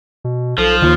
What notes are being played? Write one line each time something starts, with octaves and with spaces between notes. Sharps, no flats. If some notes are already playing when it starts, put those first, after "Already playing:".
B2
B1 F3 A4
D#2 D#3 F4